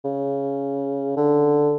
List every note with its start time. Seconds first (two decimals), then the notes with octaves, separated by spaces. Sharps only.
0.05 C#3
1.17 D3